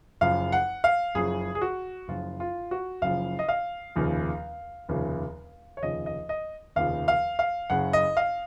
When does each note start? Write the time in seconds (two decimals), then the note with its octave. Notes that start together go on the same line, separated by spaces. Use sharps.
0.21 F#1 F#2 C#3 F3 F5
0.52 F#5
0.84 F5
1.15 F#1 F#2 C#3 F3 G#4
1.55 G#4
1.62 F#4
2.08 F#1 F#2 C#3 F3 F4
2.40 F4
2.71 F#4
3.02 F#1 F#2 C#3 F3 F5
3.39 D#5
3.49 F5
3.96 F1 D#2 C#3 F3
4.89 F1 D#2 C#3 F3
5.77 C#5
5.82 F1 D#2 C#3 F3 D#5
6.06 D#5
6.29 D#5
6.76 F1 D#2 C#3 F3 F5
7.08 F5
7.39 F5
7.70 F#1 F#2 C#3 F#5
7.93 D#5
8.17 F5